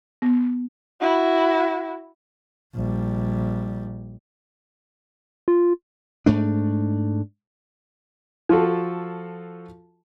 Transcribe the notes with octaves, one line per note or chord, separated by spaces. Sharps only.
B3
E4 F#4
A#1 G3
F4
G#2 A3 D4
F3 F4 F#4 A4